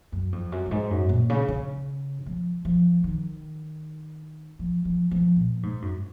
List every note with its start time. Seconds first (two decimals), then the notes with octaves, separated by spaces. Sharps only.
0.12 F#2
0.32 F2
0.52 F#2
0.66 F#2
0.71 G#2
0.91 F#2
1.09 A#2
1.30 C#3
1.48 C#3
2.26 F3
2.65 F3
3.04 D#3
4.59 F3
4.85 F3
5.11 F3
5.36 A#2
5.63 G#2
5.82 F#2